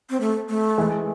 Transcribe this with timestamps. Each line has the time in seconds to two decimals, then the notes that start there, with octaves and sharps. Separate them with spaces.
0.10 C4
0.20 A3
0.49 A3
0.78 E3 G#3